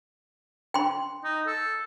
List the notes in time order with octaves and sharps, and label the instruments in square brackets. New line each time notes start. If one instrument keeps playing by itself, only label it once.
[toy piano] G5 C6
[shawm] D#4
A4